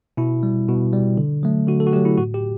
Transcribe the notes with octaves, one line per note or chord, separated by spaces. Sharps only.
B2 E4
G3
B2
G3
D3
F#3 A3
D3 F#4
A4
F#4
F#3 A3 G4
E4
A2 F#4
G4